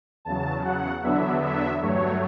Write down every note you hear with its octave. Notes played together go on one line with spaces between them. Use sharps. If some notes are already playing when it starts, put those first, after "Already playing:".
E2 C#3 F#3 A5
F#5
E2 D3 F#3 B3 D4 E5
E5
G2 F#3 A3 C#5